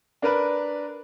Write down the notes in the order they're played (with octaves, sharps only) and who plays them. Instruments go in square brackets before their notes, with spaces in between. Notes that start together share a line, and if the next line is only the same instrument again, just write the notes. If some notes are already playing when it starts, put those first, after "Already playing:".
[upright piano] D4 A#4 B4